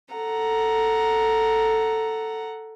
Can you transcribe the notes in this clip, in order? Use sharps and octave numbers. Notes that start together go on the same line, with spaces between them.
A4 F#5 A#5